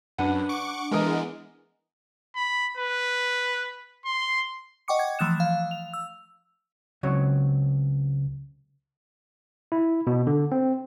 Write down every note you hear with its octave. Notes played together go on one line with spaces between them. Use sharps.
F#2 D4 B4 F#5
C#6 D6
E3 G#3 B3 A#4 D#5
B5
B4
C6
D#5 F#5 G5 C#6 D6 C#7
G#6
E3 F3 A3 D#6 F#6 E7
F5
F7
E6
C#2 C#3 F#3 C4 C#5
E4
B2
D3
C4